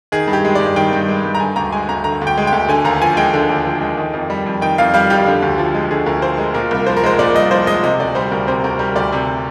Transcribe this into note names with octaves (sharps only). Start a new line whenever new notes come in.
D#3 G#4
G2
G4
G#3
G2 D5
D#3 G5
G2
G#3
G2
A#5
D3 G#5
D2 A#5
G#3 G#5
D2 A#5
D3 A#5
D2
G5
G#3
G5
D2
D3 G#5
D#2 A#5
F3 G#5
G#3 G5
D3
D#2
F3
G#3
D#3
F2
G3
F2
D#3 G5
F2 F5
G3 F5
F2 G4
D3
D2
F3
G#3
D3 G#4
D2 A#4
F3 C5
G#3 A#4
A#2 A#4
C2
F3 C5
A#4
G#3 C5
A#2 D5
C2 D#5
F3 C5
G#3 D#5
C3 D#5
D2 D5
G3 C5
D2 A#4
C3 C5
D2 A#4
G3 A#4
D2 D5
C3